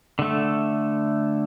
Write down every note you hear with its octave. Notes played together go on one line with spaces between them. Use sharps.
D3 A3